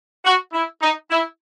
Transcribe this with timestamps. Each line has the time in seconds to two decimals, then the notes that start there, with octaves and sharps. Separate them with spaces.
0.25 F#4
0.53 E4
0.82 D#4
1.11 E4